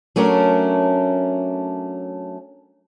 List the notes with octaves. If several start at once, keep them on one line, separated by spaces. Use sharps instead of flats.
F#3 A3 C#4 D4 A#4